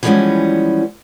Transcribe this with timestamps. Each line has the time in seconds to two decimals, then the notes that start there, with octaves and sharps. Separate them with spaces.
0.03 E3 F3 G3 G#3 B3 C#4